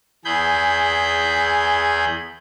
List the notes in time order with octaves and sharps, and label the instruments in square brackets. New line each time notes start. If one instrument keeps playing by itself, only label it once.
[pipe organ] E2 G#4 B5 G6